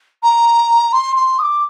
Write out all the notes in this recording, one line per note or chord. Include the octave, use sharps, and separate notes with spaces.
A#5
C6
C6
D#6
D6